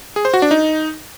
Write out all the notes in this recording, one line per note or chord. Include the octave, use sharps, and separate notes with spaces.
G#4
C5
F#4
D4
D#4